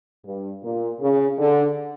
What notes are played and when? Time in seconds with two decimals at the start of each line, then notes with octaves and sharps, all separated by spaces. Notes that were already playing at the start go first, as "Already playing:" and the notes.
0.25 G2
0.63 A#2
1.00 C#3
1.38 D3